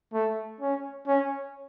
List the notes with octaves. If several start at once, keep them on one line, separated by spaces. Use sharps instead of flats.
A3
C#4
C#4